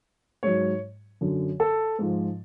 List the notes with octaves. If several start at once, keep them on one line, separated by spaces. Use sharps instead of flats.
G#2 F#3 C#5
F#2 D3 F#3
A4
G#2 F3